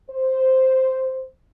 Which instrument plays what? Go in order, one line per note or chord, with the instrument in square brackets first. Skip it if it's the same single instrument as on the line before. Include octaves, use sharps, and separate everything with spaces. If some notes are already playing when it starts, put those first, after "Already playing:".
[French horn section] C5